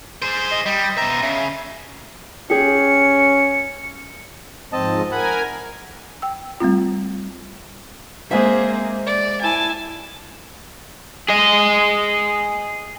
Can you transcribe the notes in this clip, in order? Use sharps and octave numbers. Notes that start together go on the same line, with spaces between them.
G#4 C5
D#5
G3 D#5
B2 E5 A#5
C#3 E5
C#4 G4 G#4 C#7
G#2 F3 C4 D#5 A5
A#4 F#5 G#5 B5
G5 E6
G3 A3 C4 F4
G#3 A#3 C4 G#4 C5 E5
D5
E4 G#5 A5
G#4 D#5